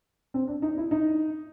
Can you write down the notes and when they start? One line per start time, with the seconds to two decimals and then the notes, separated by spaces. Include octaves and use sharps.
0.34 C4
0.48 D4
0.62 D#4
0.77 E4
0.91 D#4